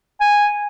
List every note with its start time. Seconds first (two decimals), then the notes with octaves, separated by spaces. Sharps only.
0.21 G#5